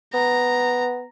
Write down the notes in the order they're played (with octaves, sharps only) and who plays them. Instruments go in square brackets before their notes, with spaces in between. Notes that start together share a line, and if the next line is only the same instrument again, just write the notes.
[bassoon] B3 [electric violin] A#5